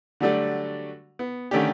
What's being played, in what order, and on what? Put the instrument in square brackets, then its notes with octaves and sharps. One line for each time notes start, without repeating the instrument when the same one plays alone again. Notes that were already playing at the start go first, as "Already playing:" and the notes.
[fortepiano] D3 F#3 G3 A3 D4 F#4
B3
D3 D#3 A3 C#4 D4 G4